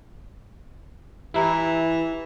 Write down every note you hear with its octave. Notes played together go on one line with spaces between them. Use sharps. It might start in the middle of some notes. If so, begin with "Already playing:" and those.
E3 E4 G4 E5 A#5